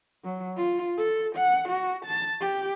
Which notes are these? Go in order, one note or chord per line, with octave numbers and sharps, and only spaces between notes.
F#3
F4
A4
F#5
F#4
A5
G4